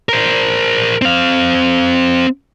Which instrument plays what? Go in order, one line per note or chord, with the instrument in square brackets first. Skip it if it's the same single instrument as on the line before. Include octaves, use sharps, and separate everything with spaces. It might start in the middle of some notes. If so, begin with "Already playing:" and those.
[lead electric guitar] A#4 C5
C4 F5